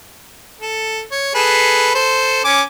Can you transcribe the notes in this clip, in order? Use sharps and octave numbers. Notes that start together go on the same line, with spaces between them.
A4
C#5
G#4 A4 B4
A4 C5
C#4 G#5 D6